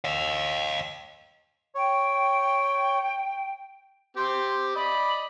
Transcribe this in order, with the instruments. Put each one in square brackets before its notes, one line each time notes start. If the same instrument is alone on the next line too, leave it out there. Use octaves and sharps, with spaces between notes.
[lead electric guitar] D#5 F5
[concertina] C#5 [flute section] G5
[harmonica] C4 G4 [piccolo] C6
[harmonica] D5 D#5 [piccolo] B5